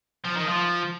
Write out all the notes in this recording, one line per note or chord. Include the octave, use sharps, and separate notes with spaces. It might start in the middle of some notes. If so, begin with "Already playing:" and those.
F3
D#3
F3